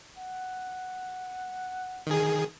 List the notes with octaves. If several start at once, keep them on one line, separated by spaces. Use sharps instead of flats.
F#5
D#3 G#4